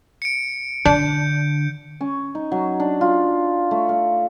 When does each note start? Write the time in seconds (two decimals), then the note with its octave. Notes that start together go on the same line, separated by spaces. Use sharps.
0.22 C#7 D7
0.85 D3 D4 G6
2.01 C#4
2.35 D#4
2.52 F#3
2.80 D4
3.01 F4
3.71 A3
3.89 F5